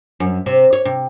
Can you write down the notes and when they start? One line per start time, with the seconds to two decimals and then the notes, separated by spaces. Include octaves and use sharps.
0.20 F#2
0.46 C3
0.73 C#5
0.85 C3